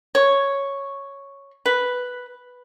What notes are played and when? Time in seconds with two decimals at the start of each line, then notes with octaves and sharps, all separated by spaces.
0.15 C#5
1.66 B4